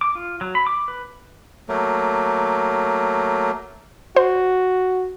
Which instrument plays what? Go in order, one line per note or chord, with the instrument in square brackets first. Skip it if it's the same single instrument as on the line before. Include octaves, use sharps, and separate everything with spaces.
[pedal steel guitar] D6
F4
F#3
B5
D6
B4
[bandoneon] F#3 A3 A#3
[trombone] F#4 [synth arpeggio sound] C5